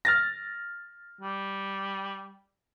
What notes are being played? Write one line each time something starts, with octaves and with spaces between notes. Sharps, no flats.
F6 A6 A#6
G3